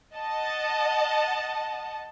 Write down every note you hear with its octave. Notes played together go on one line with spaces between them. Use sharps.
D#5 F#5 A5